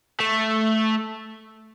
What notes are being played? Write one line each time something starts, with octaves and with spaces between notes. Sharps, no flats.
A3